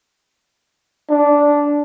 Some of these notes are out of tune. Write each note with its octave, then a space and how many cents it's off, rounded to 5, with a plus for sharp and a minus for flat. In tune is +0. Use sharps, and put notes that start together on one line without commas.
D4 -10